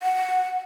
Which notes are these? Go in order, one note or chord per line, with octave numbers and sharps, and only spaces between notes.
F#5